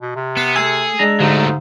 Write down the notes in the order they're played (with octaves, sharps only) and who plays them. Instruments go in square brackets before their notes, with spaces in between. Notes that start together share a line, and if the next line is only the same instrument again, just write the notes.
[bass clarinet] B2
C3
[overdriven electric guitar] B3 [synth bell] C7 C#7 E7
[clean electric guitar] A3 G#5 [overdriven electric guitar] G#4 [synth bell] E6
[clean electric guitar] G#3 D4 A#5
[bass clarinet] G#2 [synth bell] D3 [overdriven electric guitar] F#3 A3